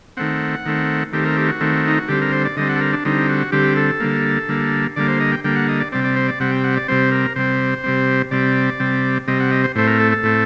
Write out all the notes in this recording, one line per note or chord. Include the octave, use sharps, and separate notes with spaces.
D#3 A3 C4 F#5
D#3 A3 C4
D#3 A3 C4 G4
A#4
G4
F#4
D#3 A3 C4
D#4
F#4
D3 G3 C4 G4
A#4
C5
D5
D3 G3 C4 D#5
F#5
A4
A#4
D4
D3 G3 C4 D#4
F#4
D3 G3 C4 G4
A4
D3 G3 A#3
D3 G3 A#3
D3 G3 A#3 D5
C5
D#5
G5
D3 G3 A#3 G5
F#5
D#5
D5
C3 G3 C4 D5
D5
C5
D5
C3 G3 C4 F#5
G5
F#5
D5
C3 G3 C4 C5
A#4
C3 G3 C4 C5
C3 G3 C4
C3 G3 C4 D5
C3 G3 C4
C3 G3 C4 D#5
F#5
D#5
C5
A2 A3 C4 C5
A#4
A4
A4
A2 A3 C4